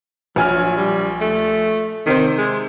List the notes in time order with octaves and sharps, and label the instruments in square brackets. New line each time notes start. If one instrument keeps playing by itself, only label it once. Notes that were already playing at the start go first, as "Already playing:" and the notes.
[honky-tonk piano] A#1 G#5 F6 [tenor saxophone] F#3
[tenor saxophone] G3
A3
[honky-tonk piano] C3 C5 [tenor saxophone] D#3
[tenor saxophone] G#3